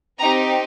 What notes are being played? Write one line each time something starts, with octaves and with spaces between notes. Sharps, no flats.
C4 D#4 G4 A#5